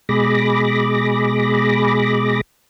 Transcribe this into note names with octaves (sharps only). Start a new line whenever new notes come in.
B2 G#3 G#4 B5 D6 A#6